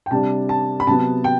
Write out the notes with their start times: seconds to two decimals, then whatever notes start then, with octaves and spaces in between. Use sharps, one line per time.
0.06 G5
0.11 C3 G3 D4 A5
0.49 A5
0.80 B5
0.87 C3 F#3 B3 A5
1.24 G5